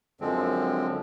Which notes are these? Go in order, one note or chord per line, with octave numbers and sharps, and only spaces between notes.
F#2 D3 F3 G#3 C4